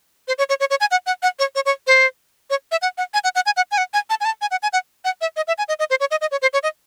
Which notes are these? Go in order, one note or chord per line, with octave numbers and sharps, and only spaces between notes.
C5
C#5
C#5
C#5
C#5
G#5
F#5
F#5
F#5
C#5
C#5
C#5
C5
C#5
E5
F#5
F#5
G#5
F#5
F#5
G#5
F#5
G#5
F#5
G#5
A5
G#5
A5
G#5
F#5
G#5
F#5
F#5
E5
D#5
E5
G#5
D#5
D#5
C5
C#5
D#5
D#5
C#5
C5
C#5
D#5